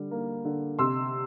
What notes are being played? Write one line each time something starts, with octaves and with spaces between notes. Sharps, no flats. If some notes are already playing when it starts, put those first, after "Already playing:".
Already playing: D3 G3
A#3
D3
C3 C6 E6